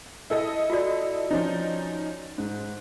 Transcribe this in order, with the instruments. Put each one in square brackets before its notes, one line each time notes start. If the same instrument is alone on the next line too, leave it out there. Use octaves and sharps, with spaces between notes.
[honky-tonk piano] E4 A4 D#5
[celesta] F4 F#4 D5
[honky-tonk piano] F3 C#4 D#4
G#2